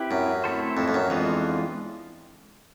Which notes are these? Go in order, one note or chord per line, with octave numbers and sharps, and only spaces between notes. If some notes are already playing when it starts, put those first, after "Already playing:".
Already playing: C4 E4 G4 B4
F#2
A3 C4 E4 A4 C5
F2
F2
F#2
F2 E3 G#3 B3 D4 F4